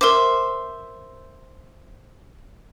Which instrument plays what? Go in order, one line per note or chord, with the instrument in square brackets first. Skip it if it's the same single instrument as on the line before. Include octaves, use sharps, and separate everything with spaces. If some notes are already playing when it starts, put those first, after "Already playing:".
[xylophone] A#4 D6 [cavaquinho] C5 E5